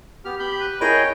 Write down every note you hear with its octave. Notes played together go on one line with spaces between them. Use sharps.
B3 G4 F6
G4 B5 G6
B4
E4 G#4 A#4 C#5 D#5 G5 B5